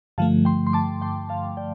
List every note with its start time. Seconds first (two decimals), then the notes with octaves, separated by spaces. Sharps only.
0.18 G2 D3 F3 A3 F5 A5
0.45 G5 C6
0.67 C6
0.73 A5 D6
1.02 G5 C6
1.29 F5 A5
1.57 D5 G5